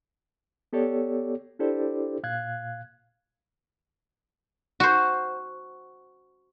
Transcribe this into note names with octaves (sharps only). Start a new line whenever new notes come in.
B3 G4 A4 C#5 D5
D4 E4 G4 A4 C5 D5
A#2 F5 F#6 G#6
F#4 C5